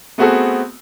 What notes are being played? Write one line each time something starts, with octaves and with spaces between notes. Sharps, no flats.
A3 B3 C4 F#4 G#4 A4